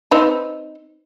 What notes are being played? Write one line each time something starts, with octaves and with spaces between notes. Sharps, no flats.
C4 D#4 B4